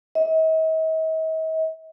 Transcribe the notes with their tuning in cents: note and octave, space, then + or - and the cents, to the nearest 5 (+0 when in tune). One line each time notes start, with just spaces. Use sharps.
D#5 +45